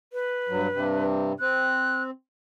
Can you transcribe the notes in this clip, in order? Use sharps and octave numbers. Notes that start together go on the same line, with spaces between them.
B4
G2 F#3
G2 C3
C4 F#6